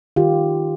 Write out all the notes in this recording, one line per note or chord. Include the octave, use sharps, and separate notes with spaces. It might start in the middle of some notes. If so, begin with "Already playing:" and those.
D#3 F4 G4